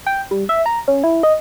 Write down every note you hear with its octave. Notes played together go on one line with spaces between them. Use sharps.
G5
G3
E5
A#5
C#4
E4
D#5